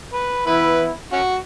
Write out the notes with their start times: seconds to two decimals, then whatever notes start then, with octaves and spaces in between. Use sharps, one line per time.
0.13 B4
0.46 E3 B3 E4 B4
1.13 C#4 F#4